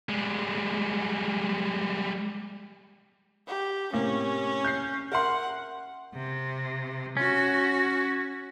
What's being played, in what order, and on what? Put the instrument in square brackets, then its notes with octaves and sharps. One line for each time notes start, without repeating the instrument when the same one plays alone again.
[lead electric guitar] G3 G#3
[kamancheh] G4
[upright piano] A2 C3 A#3 [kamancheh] C#4
[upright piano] G6 C7
[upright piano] A#4 E5 C6 [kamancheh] F#5
[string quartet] C3
[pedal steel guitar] C#4 [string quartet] F#4